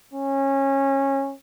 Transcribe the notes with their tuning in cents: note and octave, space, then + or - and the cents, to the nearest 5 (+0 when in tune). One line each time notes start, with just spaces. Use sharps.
C#4 -20